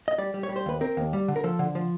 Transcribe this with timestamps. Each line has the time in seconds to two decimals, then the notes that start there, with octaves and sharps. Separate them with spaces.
0.08 D#5
0.18 G3 D5
0.34 G3
0.43 C#5
0.49 G3
0.56 C5
0.66 D#2 B4
0.81 C4 A#4
0.97 D#2
1.13 G3
1.28 D3
1.36 A#4
1.44 F3 A4
1.59 D3
1.75 F3